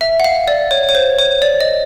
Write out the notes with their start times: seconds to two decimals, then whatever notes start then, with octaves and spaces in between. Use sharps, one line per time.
0.01 E5
0.20 F#5
0.24 F5
0.48 D5
0.71 C#5
0.89 C#5
0.95 C5
1.19 C#5
1.42 D5
1.61 D#5